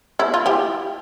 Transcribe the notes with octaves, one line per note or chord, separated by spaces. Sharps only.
E4
F4
E4 G4